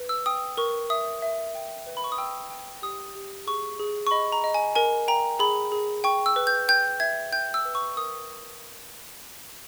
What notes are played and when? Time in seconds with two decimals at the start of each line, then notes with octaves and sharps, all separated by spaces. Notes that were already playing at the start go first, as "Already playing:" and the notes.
Already playing: B4
0.09 E6
0.26 G5 D#6
0.57 A#4 C#6
0.90 E5 D#6
1.22 E5
1.55 G5
1.87 B4
1.97 B5
2.04 C#6
2.12 D#6
2.18 G5 E6
2.50 G5
2.82 G4 D#6
3.15 G4
3.47 G#4 C#6
3.79 G#4
4.07 C#6
4.11 D#5 B5
4.32 A#5
4.44 D#5
4.54 G#5
4.75 A#4 G#5
5.08 G5 A#5
5.39 G#4 B5
5.72 G#4
6.04 G5 C#6
6.26 E6
6.36 B4
6.47 G6
6.68 G5 G6
7.00 E5 G#6
7.32 G5 G6
7.54 E6
7.65 B4
7.75 C#6
7.97 A#4 D#6